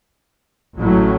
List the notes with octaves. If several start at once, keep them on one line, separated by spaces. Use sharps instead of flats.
A1 A2 F#3